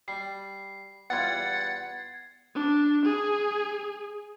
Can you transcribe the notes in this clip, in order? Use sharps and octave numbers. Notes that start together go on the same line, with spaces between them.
G3 C7
E2 G3 F4 F#5 G#6 A6
D4
G#4